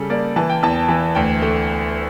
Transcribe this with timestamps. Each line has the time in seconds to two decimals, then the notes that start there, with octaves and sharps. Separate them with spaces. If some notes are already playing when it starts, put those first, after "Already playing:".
Already playing: C#3 G3 A4
0.10 A#3 D5
0.36 E3 A5
0.50 G5
0.63 E2 A5
0.89 E3
1.15 D2 G5
1.42 A3